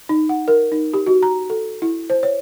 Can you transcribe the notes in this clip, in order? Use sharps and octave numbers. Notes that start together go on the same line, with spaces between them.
D#4
F#5
A#4
D#4
G4
F#4
A#5
A4
E4
C5
C#5